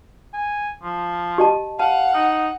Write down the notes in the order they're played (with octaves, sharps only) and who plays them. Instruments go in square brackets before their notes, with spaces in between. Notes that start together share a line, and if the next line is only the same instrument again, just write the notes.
[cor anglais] G#5
F3
[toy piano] G4 D#5 A5
[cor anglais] F5 [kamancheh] F#5 [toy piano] A5
[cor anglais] D#4